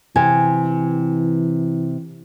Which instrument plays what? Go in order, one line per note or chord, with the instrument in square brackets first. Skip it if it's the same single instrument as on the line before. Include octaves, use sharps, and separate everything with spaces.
[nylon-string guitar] C3 [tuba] E3 [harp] G#5